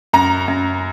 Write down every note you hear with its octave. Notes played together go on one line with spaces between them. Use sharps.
F#2 A#5
F#2